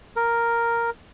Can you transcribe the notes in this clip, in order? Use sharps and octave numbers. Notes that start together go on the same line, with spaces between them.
A#4